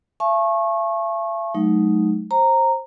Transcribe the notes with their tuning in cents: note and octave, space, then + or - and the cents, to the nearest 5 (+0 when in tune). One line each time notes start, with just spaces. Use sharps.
E5 +45 A5 -40 C#6 -25
F#3 +0 A3 -35 D#4 +0
C5 +25 A#5 -10